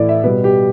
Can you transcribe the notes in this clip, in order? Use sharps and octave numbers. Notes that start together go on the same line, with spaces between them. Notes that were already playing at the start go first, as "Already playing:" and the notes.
Already playing: A2 E3 E4 A4 D5
E5
B2 G3 B4
G4